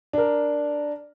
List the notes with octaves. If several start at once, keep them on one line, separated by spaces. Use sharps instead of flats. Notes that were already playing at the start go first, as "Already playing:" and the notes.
D4 A#4